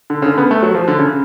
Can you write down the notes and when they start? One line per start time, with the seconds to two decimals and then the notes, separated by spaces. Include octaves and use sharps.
0.10 D3
0.22 C#3
0.26 D3
0.38 B3
0.51 A3
0.63 F#3
0.75 F3
0.88 D3
0.99 C#3